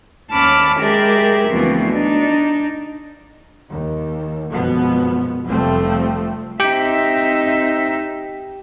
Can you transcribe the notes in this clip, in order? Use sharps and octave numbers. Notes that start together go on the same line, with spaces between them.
D#2 C#4 A5 B5 D6 F6
G#3 G4 G#4 A#4 D5 E5
D2 B2 E3 F3 C4
D4 D#4
D#2
G#1 F#2 B2 F3 B3
F1 F3 G3 A3 C4
C4 D#4 G4 E5 G5